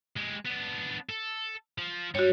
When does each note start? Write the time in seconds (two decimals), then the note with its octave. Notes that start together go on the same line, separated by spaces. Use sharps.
0.16 G#3 G4
0.45 B3 D4
1.09 A4
1.78 F3
2.15 G2 G3 F#4 C#5